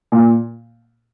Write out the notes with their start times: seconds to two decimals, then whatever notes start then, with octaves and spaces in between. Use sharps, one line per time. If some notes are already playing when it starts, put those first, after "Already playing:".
0.12 A#2